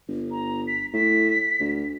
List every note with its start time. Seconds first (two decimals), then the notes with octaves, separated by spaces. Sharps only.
0.08 G1
0.31 A#5
0.67 B6
0.94 A2 B6
1.60 D2